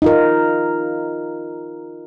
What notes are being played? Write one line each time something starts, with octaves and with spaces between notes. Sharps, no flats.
D#4 F4 A#4